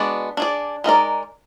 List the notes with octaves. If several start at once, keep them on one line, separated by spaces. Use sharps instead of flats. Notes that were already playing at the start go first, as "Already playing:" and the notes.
Already playing: G#3 B3 D4 F#4 D5
D4 G#4 D5
G#3 B3 D#4 A#4 D5